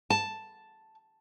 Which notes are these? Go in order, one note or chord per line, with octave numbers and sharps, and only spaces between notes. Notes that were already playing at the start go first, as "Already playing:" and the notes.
A5